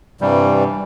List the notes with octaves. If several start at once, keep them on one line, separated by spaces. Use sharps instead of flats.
G2 C3 E3 G3